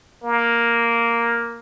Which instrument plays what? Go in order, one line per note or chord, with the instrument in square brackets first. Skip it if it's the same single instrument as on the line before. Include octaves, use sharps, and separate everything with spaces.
[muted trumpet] A#3